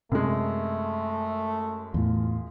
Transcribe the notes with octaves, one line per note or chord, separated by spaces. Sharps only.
F#2 C3 G#3 A3
E2 A2 F4